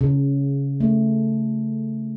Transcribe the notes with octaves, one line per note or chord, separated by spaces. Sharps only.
C#3
A3